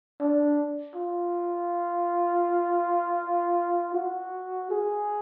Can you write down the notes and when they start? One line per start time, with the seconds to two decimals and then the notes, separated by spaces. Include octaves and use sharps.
0.20 D4
0.96 F4
3.95 F#4
4.70 G#4